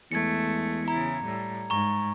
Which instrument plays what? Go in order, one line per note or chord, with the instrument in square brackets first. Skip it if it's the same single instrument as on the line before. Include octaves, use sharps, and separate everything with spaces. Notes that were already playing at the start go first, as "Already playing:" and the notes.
[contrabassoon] E2 [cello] G#3 A3 [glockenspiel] G#6 C#7
[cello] C#3 E4 [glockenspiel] A#5
[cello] A2 G3
[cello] G#2 [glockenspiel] A#5 C#6